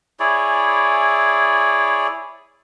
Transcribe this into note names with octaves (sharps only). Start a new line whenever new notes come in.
E4 G#4 C#5 D5